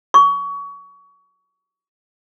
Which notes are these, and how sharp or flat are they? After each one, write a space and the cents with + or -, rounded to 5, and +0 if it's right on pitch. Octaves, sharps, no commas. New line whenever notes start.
C#6 +25